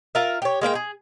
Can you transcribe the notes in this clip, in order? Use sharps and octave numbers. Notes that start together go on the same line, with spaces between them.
F4 A#4 E5
G4 C#5
G#3 A#3 D4 G5
G#4